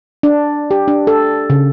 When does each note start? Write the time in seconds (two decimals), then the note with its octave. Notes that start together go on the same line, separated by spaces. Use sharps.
0.23 D4
0.71 G4
0.88 D4
1.07 A4
1.50 C#3